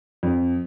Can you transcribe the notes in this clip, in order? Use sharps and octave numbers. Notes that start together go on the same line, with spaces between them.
F2